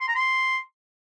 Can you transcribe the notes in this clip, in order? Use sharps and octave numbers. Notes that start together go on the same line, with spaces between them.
C6
A#5
C6